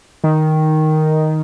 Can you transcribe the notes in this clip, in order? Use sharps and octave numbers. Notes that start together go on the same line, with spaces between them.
D#3